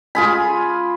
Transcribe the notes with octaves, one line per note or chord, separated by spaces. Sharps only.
F4 G#4 B5